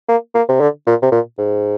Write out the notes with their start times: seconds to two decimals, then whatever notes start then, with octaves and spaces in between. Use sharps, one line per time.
0.08 A#3
0.34 A#3
0.49 C3
0.60 D3
0.86 A#2
1.02 C3
1.12 A#2
1.38 G#2